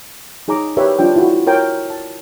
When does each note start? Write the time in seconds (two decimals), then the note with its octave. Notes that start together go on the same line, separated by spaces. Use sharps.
0.48 D#4 G#4 C#5 A#5 D6
0.77 G4 A#4 B4 C#5 E5 F5
0.99 D4 F4 G5
1.16 E4 F#4
1.47 A#4 C#5 G5 A#5
1.90 A5